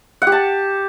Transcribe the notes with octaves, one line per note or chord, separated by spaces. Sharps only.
F#5
G4
A5